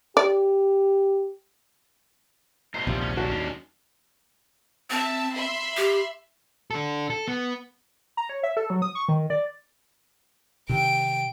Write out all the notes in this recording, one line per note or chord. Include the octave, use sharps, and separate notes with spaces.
G4 D5
B2 A3 D#4 C5 D#5
A#1 D#2 C3 F3 G3 F4
C#4
G#2 C#4 D4 F#4
D#2 G#3 A#4
C4 E5 A5
E5 B5 C6
G4
D4 A4
A4
B3
A#5
C#5
E5
A4
F#3
D#6
C#6
D#3
D5
C3 D#3 G5 D7